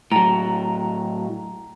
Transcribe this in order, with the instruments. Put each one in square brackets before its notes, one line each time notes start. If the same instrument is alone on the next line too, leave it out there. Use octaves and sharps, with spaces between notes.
[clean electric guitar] A2 F#3 [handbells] A#5